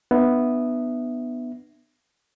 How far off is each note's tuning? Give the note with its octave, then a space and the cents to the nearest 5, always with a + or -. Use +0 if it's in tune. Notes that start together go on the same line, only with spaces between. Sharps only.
B3 +0 D4 +45 E5 +0